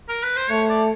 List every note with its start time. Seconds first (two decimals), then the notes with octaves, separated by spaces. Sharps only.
0.09 A#4
0.23 B4
0.36 C5
0.50 A3 C#5
0.70 D5